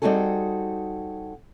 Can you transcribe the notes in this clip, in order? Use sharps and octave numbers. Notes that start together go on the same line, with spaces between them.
G3 C4 D#4 F#4 G#4 A4